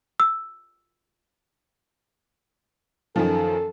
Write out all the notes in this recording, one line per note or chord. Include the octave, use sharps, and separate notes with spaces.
E6
F#2 D#3 F3 A4